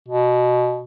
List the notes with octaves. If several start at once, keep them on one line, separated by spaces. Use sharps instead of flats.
B2